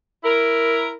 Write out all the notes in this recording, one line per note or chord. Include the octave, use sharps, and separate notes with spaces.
E4 A#4